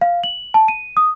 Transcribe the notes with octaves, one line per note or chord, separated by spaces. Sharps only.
F5
F#7
A5
D#7
D#6